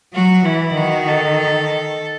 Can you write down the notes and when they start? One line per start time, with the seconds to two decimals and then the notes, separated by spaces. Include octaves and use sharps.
0.14 F#3 F#4
0.45 E3 E4
0.76 D#3 F#4
1.07 A4